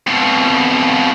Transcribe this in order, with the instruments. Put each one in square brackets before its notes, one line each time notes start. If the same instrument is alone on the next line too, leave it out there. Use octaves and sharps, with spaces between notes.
[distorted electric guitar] F2 B2